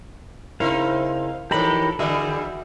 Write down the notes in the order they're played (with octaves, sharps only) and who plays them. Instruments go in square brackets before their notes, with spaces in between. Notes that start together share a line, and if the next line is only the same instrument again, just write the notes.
[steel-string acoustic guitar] C#3 E4 A#4 [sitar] C4 D#4 [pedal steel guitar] F5
[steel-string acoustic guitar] E3 D#4 [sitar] F3 A4 [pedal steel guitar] G4 A#4 B5
[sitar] D3 E3 G3 [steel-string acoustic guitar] F#4 E5 [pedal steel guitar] G#4